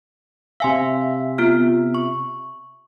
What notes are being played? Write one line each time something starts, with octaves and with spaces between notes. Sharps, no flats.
C3 E5 F5 G#5 C6
B3 F4 F6
C#6